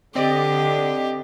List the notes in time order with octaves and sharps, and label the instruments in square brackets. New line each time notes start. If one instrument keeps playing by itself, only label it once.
[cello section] D3 [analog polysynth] C4 D5 D#5 [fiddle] G4